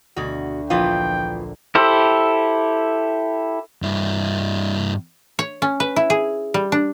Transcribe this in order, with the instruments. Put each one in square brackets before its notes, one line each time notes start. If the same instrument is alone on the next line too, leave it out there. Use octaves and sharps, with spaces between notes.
[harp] D2 [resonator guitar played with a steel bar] B2 F#4
[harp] A#1 A#4 [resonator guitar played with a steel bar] E3 B3 F4 [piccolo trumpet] G5
[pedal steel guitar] E4 G4 A4 C5
[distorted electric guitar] G2 E4
[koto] C#5
C#4
B4
E4
G#4
G3
D4